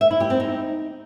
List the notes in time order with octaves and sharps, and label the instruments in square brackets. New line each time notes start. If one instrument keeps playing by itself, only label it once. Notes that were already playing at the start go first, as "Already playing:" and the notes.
[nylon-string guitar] E5
E4
G4
C4
D#4